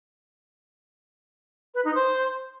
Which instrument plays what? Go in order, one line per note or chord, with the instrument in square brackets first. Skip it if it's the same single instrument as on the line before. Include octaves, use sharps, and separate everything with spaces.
[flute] B4
D#4
C5